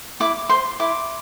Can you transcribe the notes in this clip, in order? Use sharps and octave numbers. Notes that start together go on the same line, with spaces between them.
E4 D6
C5 C6
E4 D6